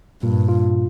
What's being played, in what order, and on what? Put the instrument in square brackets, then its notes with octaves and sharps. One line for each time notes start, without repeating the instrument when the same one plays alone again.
[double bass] G2 [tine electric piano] A#2
[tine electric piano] F4